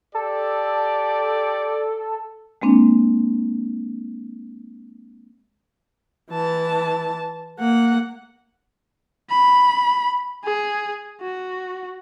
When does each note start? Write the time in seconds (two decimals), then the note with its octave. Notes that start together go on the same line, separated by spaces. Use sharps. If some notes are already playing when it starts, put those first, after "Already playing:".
0.15 G4 A4 D5
2.62 G#3 A#3 C4 D4
6.31 E3 A5
7.59 A#3 F#5
9.31 B5
10.45 G#4
11.21 F#4